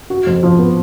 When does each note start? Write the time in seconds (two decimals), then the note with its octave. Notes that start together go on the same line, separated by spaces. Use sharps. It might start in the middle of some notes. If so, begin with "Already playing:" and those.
0.10 F#4
0.27 F2
0.43 F3
0.59 B3